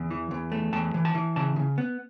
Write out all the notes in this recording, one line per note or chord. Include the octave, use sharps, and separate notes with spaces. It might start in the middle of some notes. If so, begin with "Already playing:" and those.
Already playing: E2
E3
E2
A3
E2 A5
E3
A5
E3
C#3 A5
C#3
B3